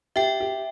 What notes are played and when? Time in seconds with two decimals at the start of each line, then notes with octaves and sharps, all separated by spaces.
0.16 G4 E5 G5
0.40 G4